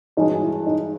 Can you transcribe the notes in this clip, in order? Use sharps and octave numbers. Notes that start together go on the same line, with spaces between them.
G2 E3 G#3 C#4 D#4 F#4
E4
D#4